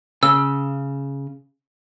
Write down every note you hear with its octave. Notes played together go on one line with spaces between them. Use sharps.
C#3 E6